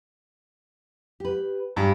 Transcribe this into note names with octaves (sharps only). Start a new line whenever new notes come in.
G4 B4
G2 G4 G#4